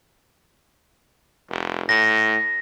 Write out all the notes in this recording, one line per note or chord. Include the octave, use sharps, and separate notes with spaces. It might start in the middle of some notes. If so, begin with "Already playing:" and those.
F1
A2 A#6